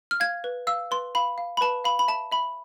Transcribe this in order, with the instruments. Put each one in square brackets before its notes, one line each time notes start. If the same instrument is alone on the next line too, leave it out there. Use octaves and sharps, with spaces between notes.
[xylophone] F6
F5 G#6
B4
F5 E6
B4 C6
F5 B5
F5
B5
B4 A5
F5 B5
B5
E5 A5
E5 B5